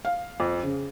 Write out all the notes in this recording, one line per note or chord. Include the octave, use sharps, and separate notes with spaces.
F5
F2
C#3